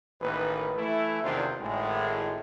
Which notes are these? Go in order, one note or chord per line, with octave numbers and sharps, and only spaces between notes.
A1 D#3 A#3 B4
E3 A3 E4
E2 C3 D#3 D4 F4 C5
G#1 A2 G#3